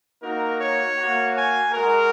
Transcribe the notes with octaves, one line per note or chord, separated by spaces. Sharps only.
A#3 D#4 F#4 A#4
C#5
A#3 F#4
G#5
G#3 F#4 A#4